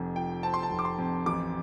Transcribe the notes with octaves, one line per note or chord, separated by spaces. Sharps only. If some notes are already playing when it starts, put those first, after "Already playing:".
Already playing: F1 F2
F3 G5
C4 A5
C6
A5
F1
D6
C6
F2
A1 D6